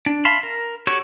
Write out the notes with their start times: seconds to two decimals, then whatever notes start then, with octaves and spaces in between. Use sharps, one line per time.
0.06 D4
0.25 E5 F5 A5 B5 C6
0.43 A#4
0.87 F#4 G4 A4 C#5 C#6